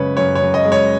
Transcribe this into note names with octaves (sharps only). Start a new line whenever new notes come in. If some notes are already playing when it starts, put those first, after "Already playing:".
Already playing: F#2 C#3 G#3 B4 C#5
F#2 C#5
C#5
F#2
D#5
G#3
C#5